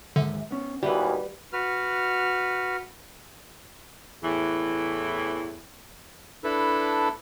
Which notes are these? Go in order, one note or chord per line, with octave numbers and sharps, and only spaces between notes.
D#2 G#2 D3 E5
B3 C#4
D#2 B2 E3 G3 F#4 B4
F#4 B4 F6
E2 A2 E3
D4 E4 A4 B4